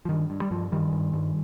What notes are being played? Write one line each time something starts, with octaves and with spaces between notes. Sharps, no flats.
F3
G2 D#3
G2
G3
G2 F3
G2 D#3 G3
G2
G2